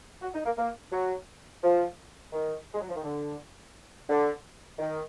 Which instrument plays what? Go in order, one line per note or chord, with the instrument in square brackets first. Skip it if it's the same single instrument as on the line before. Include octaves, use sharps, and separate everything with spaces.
[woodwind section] F#4
D#4
A#3
A#3
F#3
F3
D#3
G#3
F#3
F3
D#3
D3
D3
D#3